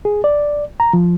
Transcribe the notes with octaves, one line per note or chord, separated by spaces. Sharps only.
G#4
D5
A#5
F3